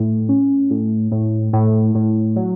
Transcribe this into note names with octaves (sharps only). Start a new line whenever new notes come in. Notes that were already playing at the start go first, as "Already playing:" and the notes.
Already playing: A2
C#4
A2
A2
A2
A2
F#3